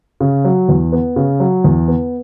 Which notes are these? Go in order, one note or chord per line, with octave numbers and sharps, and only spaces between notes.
C#3
F#3
E2
B3
C#3
F#3
E2
B3